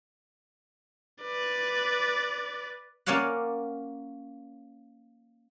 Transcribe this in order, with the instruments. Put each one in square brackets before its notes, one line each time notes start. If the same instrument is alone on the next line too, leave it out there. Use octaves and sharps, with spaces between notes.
[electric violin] B4 D5
[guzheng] A#3 C#4 C#5 D5 F5 F#5